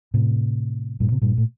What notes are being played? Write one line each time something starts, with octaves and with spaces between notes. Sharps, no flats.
A2 C3
G2 A#2
C3
G2 A#2
A2